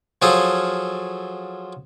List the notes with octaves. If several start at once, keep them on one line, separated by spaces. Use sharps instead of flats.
F3 F#3 G#4 A4 C5 F5